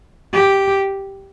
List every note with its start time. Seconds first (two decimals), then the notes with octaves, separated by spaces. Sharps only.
0.33 G4